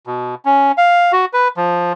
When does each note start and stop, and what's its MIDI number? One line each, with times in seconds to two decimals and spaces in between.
0.07 0.35 47
0.45 0.72 61
0.78 1.12 77
1.12 1.25 66
1.33 1.48 71
1.57 1.93 53